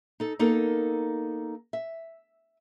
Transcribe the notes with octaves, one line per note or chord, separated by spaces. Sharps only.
D#4 A4
A#3 B3 D#4 A4 A#4
E5